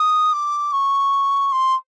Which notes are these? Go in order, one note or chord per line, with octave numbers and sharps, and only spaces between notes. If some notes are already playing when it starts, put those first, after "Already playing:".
Already playing: D#6
D6
C#6
C6